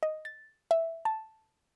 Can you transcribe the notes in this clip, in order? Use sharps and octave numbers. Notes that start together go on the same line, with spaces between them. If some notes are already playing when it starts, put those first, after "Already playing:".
D#5
A6
E5
A5